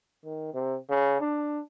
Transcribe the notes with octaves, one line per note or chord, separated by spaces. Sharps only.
D#3
C3
C#3
D4